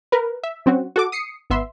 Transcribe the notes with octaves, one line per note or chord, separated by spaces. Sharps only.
A#4 B4
E5
F#3 C4 C#4 F#4
F#4 A4 D6
D#6 C7 C#7
G#1 B3 E5 C6